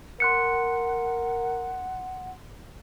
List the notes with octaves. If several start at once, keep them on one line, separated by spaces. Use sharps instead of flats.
A#4 F#5 C6 F#6 C#7